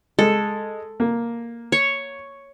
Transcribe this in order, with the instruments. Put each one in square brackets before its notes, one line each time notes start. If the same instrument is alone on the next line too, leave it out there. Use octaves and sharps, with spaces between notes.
[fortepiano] G#3 [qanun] A4
[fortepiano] A#3
[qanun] C#5